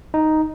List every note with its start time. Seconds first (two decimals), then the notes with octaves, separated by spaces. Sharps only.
0.14 D#4